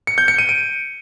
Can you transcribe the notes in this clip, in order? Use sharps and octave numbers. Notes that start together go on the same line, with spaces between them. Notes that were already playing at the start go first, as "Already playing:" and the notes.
C#7
G6
C#7
D#7
D7